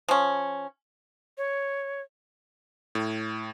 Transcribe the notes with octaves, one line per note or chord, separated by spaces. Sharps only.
F3 C#4
C#5
A2